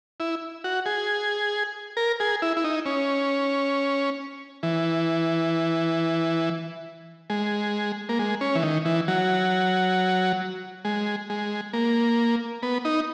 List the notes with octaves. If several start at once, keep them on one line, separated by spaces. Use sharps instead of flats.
E4
F#4
G#4
A#4
G#4
E4
E4
D#4
C#4
E3
G#3
A#3
G#3
C#4
E3
D#3
E3
F#3
G#3
G#3
A#3
B3
D#4